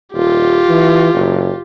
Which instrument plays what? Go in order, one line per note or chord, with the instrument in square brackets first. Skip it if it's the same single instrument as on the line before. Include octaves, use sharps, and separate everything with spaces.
[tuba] D#1 [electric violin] F4 G4
[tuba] E3
F#1